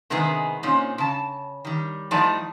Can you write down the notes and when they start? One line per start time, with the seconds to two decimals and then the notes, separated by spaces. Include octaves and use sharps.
0.10 C3 D#3 G#3 B3 G#4
0.63 A#2 C4 C#4 D#4
0.98 C#3 A5
1.65 D#3 G3
2.11 A2 F3 G3 D#4 D5 A5